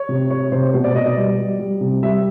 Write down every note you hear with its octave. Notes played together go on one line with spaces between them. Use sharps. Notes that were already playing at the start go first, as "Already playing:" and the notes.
Already playing: C#5
C3
C3 C#5
C3 C5
B2 C5
D5
B2 D#5
D5
G3
G3
G3
C3
G3 E5